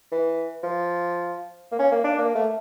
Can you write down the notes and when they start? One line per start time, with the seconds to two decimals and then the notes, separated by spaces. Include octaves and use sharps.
0.11 E3
0.63 F3
1.71 A#3
1.79 C#4
1.92 A#3
2.04 D4
2.18 A#3
2.35 A3